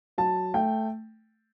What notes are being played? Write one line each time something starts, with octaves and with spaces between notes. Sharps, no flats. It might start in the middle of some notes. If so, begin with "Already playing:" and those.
F#3 A5
A3 G5